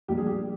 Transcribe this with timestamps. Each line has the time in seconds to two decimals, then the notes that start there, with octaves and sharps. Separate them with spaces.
0.08 A#1 A#2 G3 G4
0.17 G#4
0.27 G4